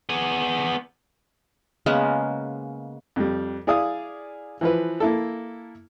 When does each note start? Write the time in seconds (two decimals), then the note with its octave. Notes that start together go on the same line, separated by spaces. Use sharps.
0.09 B3 G#4
1.86 C#3 G#3 A#3 B3
3.16 F2 G3
3.67 E4 G#4 D5 F5 D#6
4.61 E3 F3 B4
5.00 A#3 E4 A4